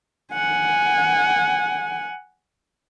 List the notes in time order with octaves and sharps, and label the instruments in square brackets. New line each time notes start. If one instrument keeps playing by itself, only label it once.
[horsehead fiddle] F#5 G#5